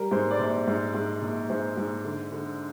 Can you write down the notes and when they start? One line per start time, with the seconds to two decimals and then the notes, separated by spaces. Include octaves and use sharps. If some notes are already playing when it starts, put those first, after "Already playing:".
Already playing: G3 A#4
0.11 G#2 C5
0.31 D5
0.39 A#1 C5
0.67 G#2
0.94 G#2
1.22 A#1
1.50 G#2 C5
1.77 G#2
2.05 D3
2.32 D3